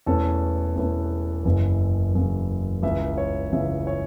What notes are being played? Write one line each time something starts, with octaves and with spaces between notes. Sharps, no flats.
E1 E2 E3 A3 C#4 A4
E1 E2 E3 A3 C#4
F#1 F#2 C#3 E3
F#1 F#2 C#3 E3
C#2 C#3 E3 E5
C#5
C#2 C#3 E3 E5
C#5